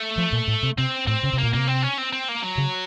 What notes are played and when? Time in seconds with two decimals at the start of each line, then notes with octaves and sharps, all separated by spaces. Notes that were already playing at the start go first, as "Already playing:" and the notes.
Already playing: A3
0.18 F3
0.32 A#2
0.48 A2
0.63 C3
0.78 C3 C4
1.07 A2 C4
1.23 C#3
1.33 C3
1.39 A#2 A#3
1.53 C3 A#3
1.68 C4
1.83 C#4
1.98 C4
2.13 C4
2.29 A#3
2.42 F#3
2.58 C#3